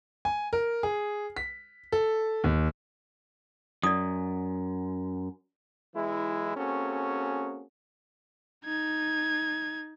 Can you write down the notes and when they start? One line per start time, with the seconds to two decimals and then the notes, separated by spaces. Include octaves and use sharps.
0.25 G#5
0.53 A#4
0.83 G#4
1.37 B6
1.92 A4
2.44 D#2
3.83 F#2 D5 D#6
5.95 B1 E3 G#3 E4
6.57 A#3 C4 C#4 F#4 G#4 A4
8.65 D#4 G#6